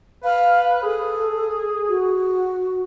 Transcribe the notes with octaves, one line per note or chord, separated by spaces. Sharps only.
B4 F5
G#4 A4
F#4